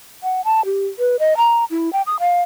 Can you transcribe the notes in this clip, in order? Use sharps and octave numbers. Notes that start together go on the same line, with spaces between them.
F#5
A5
G4
B4
D#5
A#5
E4
G5
D#6
F5